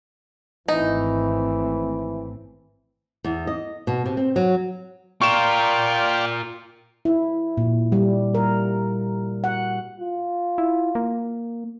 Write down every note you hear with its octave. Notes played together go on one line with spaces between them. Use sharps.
G#1 E3 A3 C4 D#4
E2
D#5
B2
C3
C4
F#3
F4 A#4 D5 F5 G5 C#6 E7
E4
A#2
G3
A#4
F#5
F4
E4
A#3